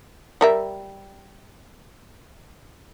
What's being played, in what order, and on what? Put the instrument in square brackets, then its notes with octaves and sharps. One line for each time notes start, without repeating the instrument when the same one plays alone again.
[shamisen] G3 A#4 E5